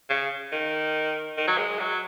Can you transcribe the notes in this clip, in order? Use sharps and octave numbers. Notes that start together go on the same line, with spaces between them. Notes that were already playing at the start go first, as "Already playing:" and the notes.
C#3
D#3
D#3
F#3
G#3
F#3